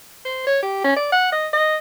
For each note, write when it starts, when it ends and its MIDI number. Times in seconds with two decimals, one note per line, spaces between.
0.25 0.44 72
0.47 0.59 73
0.62 0.81 67
0.84 0.92 61
0.96 1.09 74
1.12 1.32 78
1.32 1.47 75
1.53 1.76 75